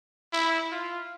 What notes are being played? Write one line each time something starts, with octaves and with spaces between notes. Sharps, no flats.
E4
F4